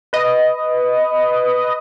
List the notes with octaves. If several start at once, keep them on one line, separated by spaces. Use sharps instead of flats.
B4 D#5